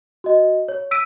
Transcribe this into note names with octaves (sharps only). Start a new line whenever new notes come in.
F#4 D#5
C#5
E6 B6 D7 D#7